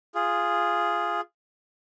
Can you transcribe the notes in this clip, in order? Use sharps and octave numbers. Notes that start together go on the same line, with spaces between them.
F4 G#4